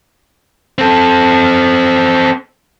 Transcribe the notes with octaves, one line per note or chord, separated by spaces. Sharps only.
C4 A4